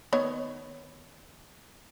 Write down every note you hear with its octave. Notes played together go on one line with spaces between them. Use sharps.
D#3 B3 C#5